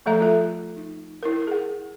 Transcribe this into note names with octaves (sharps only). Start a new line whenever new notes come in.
F3 A3 A4 E5 A#5
F4 A4
D#4
E4 A#4
G#4 F#5